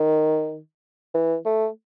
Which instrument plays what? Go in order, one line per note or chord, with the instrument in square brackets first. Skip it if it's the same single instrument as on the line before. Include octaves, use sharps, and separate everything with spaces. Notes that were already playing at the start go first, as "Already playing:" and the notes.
Already playing: [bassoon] D#3
E3
A3